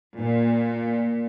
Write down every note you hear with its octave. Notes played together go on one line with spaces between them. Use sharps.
A#2